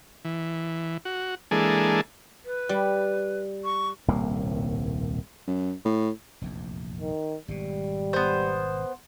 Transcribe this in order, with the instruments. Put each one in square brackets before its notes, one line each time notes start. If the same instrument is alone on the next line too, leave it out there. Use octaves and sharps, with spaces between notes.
[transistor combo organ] E3
F#4
E3 G#3 A#3 D4 G#4 A4
[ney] B4
[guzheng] G3
[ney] C#6
[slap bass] D#1 C2 A2 A#3
[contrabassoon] F#2
A2
[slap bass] F1 A#1 E2
[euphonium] D#3
[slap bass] G#1 B2 [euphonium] G3
[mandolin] B3 C5